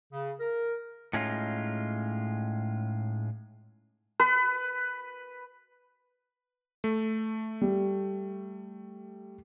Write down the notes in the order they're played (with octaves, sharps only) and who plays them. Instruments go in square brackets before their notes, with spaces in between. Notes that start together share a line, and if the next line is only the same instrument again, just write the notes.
[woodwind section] C#3
A#4
[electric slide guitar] A2 G#3 C#4 D#4 F4
[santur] B4
[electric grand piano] A3
[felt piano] G3